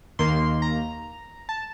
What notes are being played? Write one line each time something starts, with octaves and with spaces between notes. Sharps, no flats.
D#2 D#3 A#3 C6
A#5
A5